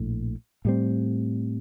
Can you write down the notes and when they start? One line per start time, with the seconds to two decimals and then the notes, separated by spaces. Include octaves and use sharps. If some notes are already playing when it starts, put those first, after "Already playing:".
Already playing: A#1 A2
0.65 A2 G3 C4